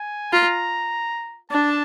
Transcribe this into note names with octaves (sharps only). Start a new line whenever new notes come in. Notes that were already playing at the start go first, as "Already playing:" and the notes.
Already playing: G#5
F4 A#5
D4 A5